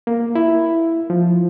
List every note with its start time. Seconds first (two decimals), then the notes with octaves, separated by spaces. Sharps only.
0.07 A#3
0.35 E4
1.10 F3